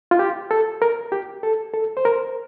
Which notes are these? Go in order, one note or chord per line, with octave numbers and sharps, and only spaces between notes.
F4
G4
A4
A#4
G4
A4
A4
C5
A#4